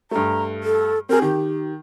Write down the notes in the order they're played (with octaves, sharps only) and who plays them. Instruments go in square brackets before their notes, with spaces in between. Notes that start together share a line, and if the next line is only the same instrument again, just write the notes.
[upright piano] G2 A3 [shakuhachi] A#5
[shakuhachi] A4
[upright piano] C4 G#4 [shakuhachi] A#4
[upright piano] D#3 [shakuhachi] G4